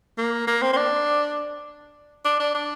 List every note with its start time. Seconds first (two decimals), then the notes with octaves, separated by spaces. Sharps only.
0.18 A#3
0.47 A#3
0.62 C4
0.73 C4
0.77 D4
2.25 D4
2.40 D4
2.54 D4